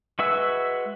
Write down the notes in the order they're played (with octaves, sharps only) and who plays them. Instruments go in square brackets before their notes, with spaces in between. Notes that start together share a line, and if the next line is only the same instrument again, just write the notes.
[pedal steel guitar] G#3 F#4 B4 E5 E6